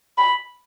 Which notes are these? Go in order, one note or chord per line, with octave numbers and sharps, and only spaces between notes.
B5